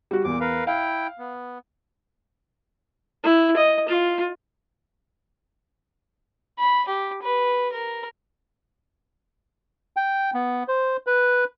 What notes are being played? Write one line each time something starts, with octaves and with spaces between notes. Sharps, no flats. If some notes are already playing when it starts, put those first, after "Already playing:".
G3 F#4
E2 A#2 D6
A#4 B4 F5
E4 F5 G5
B3
E4
D#5
F4
B5
G4
B4
A#4
G5
B3
C5
B4